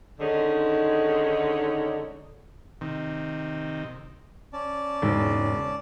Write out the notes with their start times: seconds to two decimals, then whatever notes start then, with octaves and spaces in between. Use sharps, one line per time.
0.20 D3 D#3 G#3 C#4 D#4
2.81 C3 D#3
4.53 C#4 D5 A5
5.02 E1 G#2 C#3